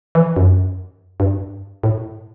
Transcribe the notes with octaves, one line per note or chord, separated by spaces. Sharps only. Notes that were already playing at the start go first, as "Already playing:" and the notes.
E3
F#2
G2
A2